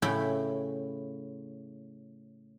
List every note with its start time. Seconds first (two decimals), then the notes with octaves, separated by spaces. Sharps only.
0.02 A2 C#3 E4 G5 B5